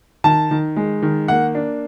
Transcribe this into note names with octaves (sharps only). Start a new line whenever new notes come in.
D#3 A5
D#3
G#3
D#3
A#3 F#5
D4